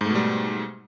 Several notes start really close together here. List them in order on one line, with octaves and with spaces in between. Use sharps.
G#2 A3 B2 G3